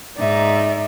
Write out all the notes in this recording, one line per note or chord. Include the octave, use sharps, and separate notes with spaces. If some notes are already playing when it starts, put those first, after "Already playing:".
G#2 D#4 D5 E5